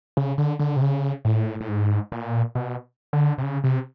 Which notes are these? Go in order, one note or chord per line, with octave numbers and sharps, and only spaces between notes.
C#3
D3
D3
C3
C#3
A2
A2
G#2
A#2
B2
D3
C3
C#3
C3